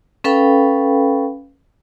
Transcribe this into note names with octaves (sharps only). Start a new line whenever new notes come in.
C#4 A4 B4 F5 G5 B5